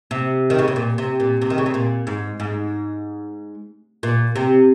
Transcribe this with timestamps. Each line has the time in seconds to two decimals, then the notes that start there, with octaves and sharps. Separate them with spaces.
0.11 C3
0.50 D#3
0.59 C#3
0.68 C3
0.76 A#2
0.98 C3
1.20 A#2
1.42 C3
1.50 D#3
1.58 C#3
1.66 C3
1.74 A#2
2.07 G#2
2.40 G#2
4.03 A#2
4.36 C3